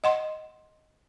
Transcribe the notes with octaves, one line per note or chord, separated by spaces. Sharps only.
D#5 F#5 C6